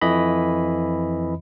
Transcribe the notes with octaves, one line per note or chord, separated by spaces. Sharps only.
F2 E3 D#5 B5